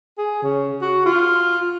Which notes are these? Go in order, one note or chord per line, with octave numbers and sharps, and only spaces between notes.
G#4
C#3
F#4
F4